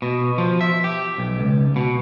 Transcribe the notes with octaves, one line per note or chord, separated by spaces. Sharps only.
B2
F3
E5
G4
B1
C#2
B2